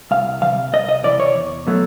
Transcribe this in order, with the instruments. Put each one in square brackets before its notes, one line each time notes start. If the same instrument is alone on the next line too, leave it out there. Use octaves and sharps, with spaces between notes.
[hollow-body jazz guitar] C2 F5
E3 F5
C3
C2 D#5
D#5
C3 E3 D5
C#5
E2
B2 F#3 A3